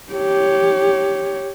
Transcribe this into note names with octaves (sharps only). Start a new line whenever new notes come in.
G4 C#5